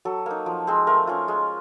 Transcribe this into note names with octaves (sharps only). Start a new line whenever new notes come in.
F#3 A4
A#3 D#4
F3
G#3 C4
A3 A#4
C#4 F4
G#3